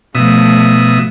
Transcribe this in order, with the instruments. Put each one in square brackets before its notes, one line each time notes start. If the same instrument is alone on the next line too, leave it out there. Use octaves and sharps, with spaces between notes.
[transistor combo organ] B2 E5 D#6 [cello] F3 A3